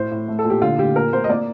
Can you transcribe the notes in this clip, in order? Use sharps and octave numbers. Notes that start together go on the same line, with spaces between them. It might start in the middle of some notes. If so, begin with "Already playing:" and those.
Already playing: A2 C5
A2
A3
A4
A#2
G4
D3 F4
D3 G4
A#2 A#4
A#3 C5
D#5
A#3 D5